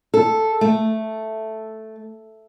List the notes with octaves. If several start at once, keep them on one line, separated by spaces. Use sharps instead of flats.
A4
A3